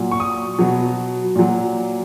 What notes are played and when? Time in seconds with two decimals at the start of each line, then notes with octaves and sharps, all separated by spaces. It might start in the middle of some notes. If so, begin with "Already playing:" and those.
Already playing: A#2 F#3
0.12 C#6
0.20 D#6
0.59 B2 F#3
1.36 A#2 F#3